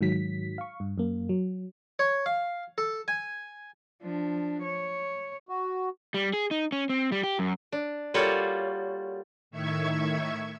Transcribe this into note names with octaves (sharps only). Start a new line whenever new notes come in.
G#2 D#3 F#3 B6
F5 C#6
G2
F#2 A#3
F#3
C#5
F5
A4
G#5
F3 D4
C#5
F#4
G3
G#4
D#4
C#4
C4
G3
G4
F#2
D4
G3 A#3 F4 F#4 A4 C#5
A2 D#3 E5 C#6 G#6